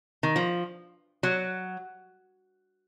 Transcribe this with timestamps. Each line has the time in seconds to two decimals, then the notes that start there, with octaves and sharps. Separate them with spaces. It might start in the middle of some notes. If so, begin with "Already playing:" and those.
0.23 D#3
0.36 F3
1.23 F#3